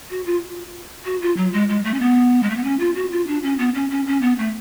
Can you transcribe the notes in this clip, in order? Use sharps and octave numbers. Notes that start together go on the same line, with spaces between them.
F#4
F4
F#4
F4
F#3
G#3
G#3
A3
C#4
B3
G#3
A3
B3
C#4
F4
F#4
F4
D4
C#4
B3
C#4
C#4
C#4
B3
A3